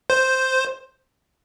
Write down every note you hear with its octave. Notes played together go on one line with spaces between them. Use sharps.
C5